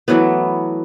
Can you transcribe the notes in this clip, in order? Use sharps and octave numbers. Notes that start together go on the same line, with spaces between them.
E3 F#3 A3 B3